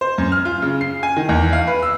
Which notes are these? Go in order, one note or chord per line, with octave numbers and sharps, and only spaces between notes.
C5
F#2
F6
F4
C#3
C7
G#5
D#3
E2
F5
B4
E6